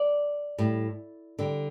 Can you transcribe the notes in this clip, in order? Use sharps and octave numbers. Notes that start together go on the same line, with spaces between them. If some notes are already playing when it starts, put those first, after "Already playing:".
Already playing: D5
A2 G3
D3 G3